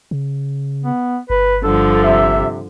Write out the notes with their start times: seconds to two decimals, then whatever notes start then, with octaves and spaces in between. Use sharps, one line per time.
0.11 C#3
0.84 B3
1.30 G1 B4
1.64 G2 D3 F3 A4
2.04 C3 E5